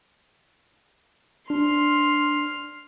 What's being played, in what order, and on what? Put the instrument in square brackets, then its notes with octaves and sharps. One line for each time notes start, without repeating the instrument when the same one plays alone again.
[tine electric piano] D4 [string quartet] C6 F6